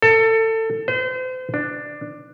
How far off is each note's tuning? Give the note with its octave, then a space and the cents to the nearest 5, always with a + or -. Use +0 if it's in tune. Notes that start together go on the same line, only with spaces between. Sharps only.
A4 +25
C5 -40
D4 +10